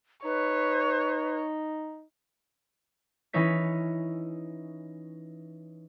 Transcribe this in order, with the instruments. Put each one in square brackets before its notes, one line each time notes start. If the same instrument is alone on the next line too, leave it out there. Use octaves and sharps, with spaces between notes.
[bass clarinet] D#4 [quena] B4 [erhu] C#5
[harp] E3 C#4 D#4 C#5 B6